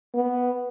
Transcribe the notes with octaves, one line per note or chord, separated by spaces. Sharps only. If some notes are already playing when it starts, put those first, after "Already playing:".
B3